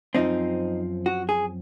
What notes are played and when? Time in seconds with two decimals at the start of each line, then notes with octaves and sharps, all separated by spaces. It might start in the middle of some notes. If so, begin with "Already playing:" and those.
0.15 F#2 F3 C4 D#4
1.06 F#4
1.29 G#4